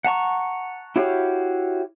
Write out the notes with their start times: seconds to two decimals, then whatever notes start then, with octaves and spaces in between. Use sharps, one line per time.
0.05 F#5 A5 A#5 C#6
0.96 E4 F#4 G4 C#5 F5